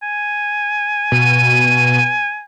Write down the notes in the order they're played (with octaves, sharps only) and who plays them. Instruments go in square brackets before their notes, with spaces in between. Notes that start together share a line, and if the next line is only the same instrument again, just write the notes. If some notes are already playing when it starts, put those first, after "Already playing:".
[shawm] G#5
[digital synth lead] B2 [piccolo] D#7